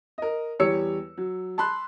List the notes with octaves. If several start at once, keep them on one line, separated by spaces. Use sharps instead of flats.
A#4 D#5
E2 G3 G4 C#5 E6 C#7
F#3
A5 B5 C6 F#6